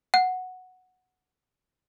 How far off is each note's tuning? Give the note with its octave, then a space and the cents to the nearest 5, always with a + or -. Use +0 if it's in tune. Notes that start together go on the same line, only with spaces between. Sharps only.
F#5 -5